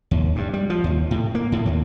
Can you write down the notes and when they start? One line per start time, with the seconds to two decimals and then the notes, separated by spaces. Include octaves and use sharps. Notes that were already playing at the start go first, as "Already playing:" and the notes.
0.11 D#2
0.36 G2
0.53 G3
0.70 F3
0.84 D#2
1.11 A2
1.35 A#3
1.52 A2
1.66 D#2